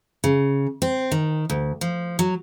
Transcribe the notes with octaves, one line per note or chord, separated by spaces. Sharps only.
C#3
C4
D#3
D2
F3
F#3